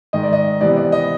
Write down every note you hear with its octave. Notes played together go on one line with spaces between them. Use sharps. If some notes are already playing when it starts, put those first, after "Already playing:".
G#2 D#3 G#3 D#5
D5
D#5
C3 E3 G3 B3 D5
D5
D#5